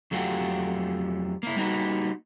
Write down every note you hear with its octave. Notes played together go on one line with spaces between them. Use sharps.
F2 F#3 A3 F4 G4 F#5
A#3 E4
G3 A#3 D#4 F#4 B4